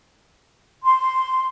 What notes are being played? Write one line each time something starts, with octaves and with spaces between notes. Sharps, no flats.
C6